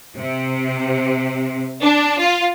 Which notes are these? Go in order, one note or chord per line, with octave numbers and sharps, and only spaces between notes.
C3
D4
F4